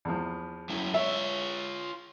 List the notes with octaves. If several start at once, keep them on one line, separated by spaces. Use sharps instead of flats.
E2 F3
F#2 E4
F4 C#5 E5